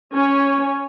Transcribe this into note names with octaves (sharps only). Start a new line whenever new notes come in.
C#4 C#5 G#5